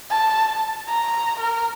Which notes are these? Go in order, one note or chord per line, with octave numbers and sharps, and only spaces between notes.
A5
A#5
A#4